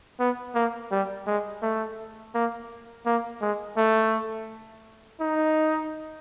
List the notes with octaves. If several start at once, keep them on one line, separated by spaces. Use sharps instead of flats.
B3
A#3
G3
G#3
A3
A#3
A#3
G#3
A3
D#4